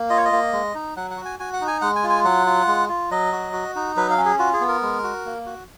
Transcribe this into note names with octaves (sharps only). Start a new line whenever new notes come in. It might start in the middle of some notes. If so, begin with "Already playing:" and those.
Already playing: A#3
F4 D#5
C#5
D#5
A#3
G#3
D#4
F#3 F#5
F#5
F#4
G#5
F#4 G#5
F#5
D#4
G#5
G#3 F#5
G#5
F4
G#5
F#3 F#5
F4
G#3
F4
F#3 D#5
F#4
F#4
D#4
F#3 B4
F5
C#4
G#4
F4 F#4
G#4
B3
A#4
G#3
F#4
A#3
F#4